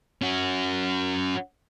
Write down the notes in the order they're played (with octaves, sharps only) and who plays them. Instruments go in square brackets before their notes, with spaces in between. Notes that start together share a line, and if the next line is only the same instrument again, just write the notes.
[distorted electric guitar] C#4 F#4